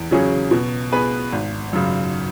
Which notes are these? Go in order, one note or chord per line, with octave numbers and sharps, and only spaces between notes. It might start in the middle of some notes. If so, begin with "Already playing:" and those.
Already playing: E2
C#3 F#3 C#4 G#4
B2
B3 G#4 B4
G#1
F#2 C#3